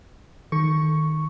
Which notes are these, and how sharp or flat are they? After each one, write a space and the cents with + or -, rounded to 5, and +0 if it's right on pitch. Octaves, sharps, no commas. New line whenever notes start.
D#3 +0 A4 +0 C#6 +0